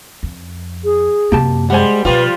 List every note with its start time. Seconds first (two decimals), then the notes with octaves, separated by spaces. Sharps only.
0.23 F2
0.84 G#4
1.32 F#2 C3 A#3 G4 A5
1.70 G3 G#3 C5 F#5 G#5
2.05 B2 F3 G3 F4 B4